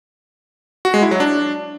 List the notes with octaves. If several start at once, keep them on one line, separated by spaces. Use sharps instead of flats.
F#4
G#3
E4
F#3
D4